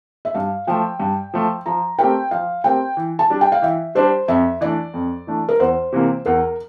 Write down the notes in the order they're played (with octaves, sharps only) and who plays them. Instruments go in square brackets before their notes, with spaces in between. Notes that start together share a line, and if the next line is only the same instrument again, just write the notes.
[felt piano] E5
[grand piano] G2 [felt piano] F5
[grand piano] F3 A3 [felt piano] G5
[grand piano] G2
F3 A3
[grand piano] F3 [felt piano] A#5
[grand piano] A3 C4 G4 A#4 [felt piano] G5
[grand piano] F3 [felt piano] F5
[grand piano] A3 C4 G4 A#4 [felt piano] G5
[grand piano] E3
[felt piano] A5
[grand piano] G3 D4 G4
[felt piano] G5
F5
[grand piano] E3 [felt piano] E5
[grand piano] G3 D4 G4 [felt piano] C5
[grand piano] F2 [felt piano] E5
[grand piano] E3 A3 D4 [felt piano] D5
[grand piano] F2
E3 A3 D4
[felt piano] A#4
[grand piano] E2 [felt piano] C5
[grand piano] C3 E3 A#3
[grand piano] E2 [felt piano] A#4